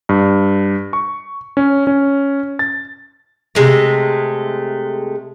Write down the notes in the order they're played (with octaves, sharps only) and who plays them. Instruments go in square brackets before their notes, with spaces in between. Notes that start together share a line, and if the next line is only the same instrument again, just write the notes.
[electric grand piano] G2
C#6
C#4
C#4
A6
[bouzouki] C3 G#3 A3